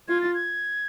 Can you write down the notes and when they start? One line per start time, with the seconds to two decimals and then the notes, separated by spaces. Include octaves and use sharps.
0.08 F4 G#6
0.21 A6
0.34 G#6